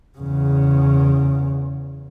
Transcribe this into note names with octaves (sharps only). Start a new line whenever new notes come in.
E2 C#3